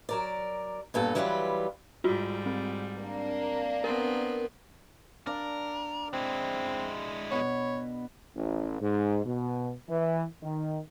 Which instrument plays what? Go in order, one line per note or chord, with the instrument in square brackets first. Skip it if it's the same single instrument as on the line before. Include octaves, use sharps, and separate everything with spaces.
[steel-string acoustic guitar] F#3 A#4 D5
G2 A#2 B3 A4
E3 F#3 G3 E4 F4 B4
[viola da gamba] G#2 G3 [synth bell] F4 F#4
[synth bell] C4
[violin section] A#3 D4
[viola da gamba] B3 C4 [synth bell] A#4
[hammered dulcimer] D4 D5 F5 [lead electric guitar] A#4
[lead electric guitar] G#3 E4 [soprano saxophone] C4
[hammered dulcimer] B2 B3 [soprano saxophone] C#5
[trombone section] A1
G#2
B2
E3
D#3